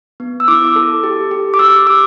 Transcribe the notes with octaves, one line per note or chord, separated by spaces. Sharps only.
B3
E6
E4 D6
A4
G4
G4
D6
G4 E6
G4 D6